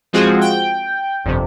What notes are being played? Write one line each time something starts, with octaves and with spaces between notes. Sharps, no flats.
F3 G#3 C4 F4 F#4 G#4
G5
G1 F2 C3